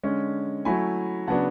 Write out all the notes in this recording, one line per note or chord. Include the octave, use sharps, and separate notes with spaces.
D3 G#3 C#4
F#3 A3 E4 G#5 B5
C#3 F#3 B3 D4 F#5 A5